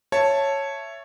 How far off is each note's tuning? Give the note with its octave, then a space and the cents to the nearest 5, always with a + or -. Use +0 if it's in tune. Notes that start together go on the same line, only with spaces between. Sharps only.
C#5 -5 E5 +15 A5 +0